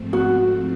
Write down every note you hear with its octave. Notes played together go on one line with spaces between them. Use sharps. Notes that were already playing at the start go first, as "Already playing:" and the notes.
Already playing: G#2 F3 A3 C4
F#4